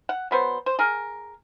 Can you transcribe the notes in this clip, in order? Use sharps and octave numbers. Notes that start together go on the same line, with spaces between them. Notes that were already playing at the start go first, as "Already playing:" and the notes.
F#5
F#3 B3 C5
C5
G#4 A#4